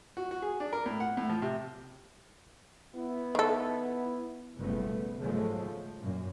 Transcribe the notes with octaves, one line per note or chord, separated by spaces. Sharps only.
F#4
F#4
G#4
D4
A#4
A2
F#5
A2
F3
C3
B3 E4
D#3 A4
F#1 B1 F3 G3 A3 B3
G#2 C#3 F3 F#3 G#3 A3
F3
F#2 A#2 A#3